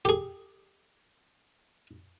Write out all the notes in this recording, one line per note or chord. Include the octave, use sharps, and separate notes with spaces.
G4 G#4